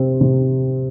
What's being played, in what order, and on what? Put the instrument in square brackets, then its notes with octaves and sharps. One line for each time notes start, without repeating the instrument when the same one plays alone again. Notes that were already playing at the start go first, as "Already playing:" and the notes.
Already playing: [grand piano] C3 C4
C3